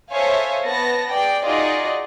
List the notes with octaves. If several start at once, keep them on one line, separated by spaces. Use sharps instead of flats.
A4 C5 C#5 E5 F5 G#5
B3 A5 A#6
G#4 D5 G5
D#4 F4 F#4 G#4 D5 D#5